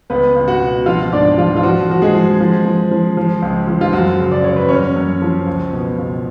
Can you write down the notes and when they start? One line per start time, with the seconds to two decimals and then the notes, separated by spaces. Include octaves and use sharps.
0.10 C#2 B3 B4
0.36 C#2
0.48 F#4 F#5
0.61 B2
0.86 F3 F4 F5
1.12 G#2 D4 D5
1.38 F3 F4
1.57 F4
1.63 F3 F#4
1.90 F3 F#4
2.02 G#3 G#4
2.14 F3
2.40 F3
2.65 F3
2.91 F3
3.17 F3
3.42 C#2
3.67 F3
3.81 F4
3.93 F#2 F#4
4.20 C#3
4.32 D5
4.44 C#3 C#5
4.56 B4
4.68 F#2 C#4 C#5
4.96 F#2
5.22 F3
5.46 C#2
5.73 B2
5.98 C#2